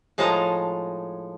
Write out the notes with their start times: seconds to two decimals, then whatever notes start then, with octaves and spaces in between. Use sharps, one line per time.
0.18 A2 F3 G#3 D#4 A5 A#5